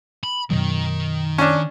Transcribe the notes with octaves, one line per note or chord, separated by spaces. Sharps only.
B5
F#2 B2 D#3 F#3
C#4 D4